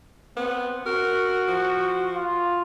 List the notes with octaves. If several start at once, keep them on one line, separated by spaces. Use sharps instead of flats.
B3 C4
F#4 A#4
F3
F4